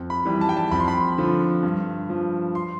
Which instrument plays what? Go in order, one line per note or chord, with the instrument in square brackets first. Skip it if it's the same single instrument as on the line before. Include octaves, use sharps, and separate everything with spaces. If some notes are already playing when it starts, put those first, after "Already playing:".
Already playing: [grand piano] F2
B5
E3 G3
A5
G5
A5
F2 B5
C6
B5
D3 F3
G2
F3
C6